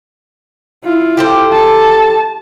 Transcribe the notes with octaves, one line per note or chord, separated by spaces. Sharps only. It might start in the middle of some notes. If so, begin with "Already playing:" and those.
E4 F4
G4 A4 C5
A5